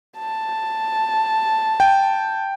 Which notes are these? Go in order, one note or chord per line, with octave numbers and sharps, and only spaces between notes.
A5
G5